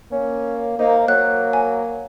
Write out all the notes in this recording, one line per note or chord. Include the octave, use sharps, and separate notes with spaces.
A#3 C#4
A#3 D#4 C5
F#3 A#3 F#6
G#5